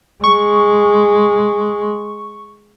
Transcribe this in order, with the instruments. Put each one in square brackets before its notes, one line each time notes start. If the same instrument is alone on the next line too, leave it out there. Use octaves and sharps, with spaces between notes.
[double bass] G#3 [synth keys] C#6